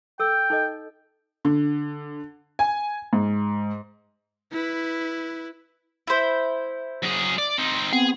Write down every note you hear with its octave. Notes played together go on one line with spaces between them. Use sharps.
A4 G5 E6
D#4 A4 D#5
D3
G#5
G#2
E4 B4
E4 C5
F#2 G#4
D5
C4 D#4
B3 C4 G#4